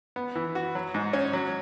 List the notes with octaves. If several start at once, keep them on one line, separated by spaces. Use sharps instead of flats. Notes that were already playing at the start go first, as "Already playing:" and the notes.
B3
E3
F#4
F#3
G#2
C#4
F#3